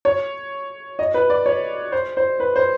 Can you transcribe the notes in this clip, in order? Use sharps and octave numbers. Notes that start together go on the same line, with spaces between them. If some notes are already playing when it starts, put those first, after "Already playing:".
C#5
D#5
B4
D5
C#5
C5
C5
B4
C5